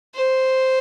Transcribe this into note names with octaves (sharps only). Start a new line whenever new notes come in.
C5